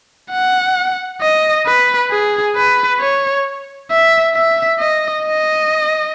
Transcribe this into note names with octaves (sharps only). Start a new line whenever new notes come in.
F#5
D#5
B4
G#4
B4
C#5
E5
E5
D#5
D#5